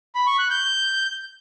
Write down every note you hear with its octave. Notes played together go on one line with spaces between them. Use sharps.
B5
C#6
F#6
G6